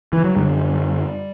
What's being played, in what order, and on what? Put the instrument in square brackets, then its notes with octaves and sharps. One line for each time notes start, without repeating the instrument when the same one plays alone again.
[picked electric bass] E3
F#3
F#2 D3 G3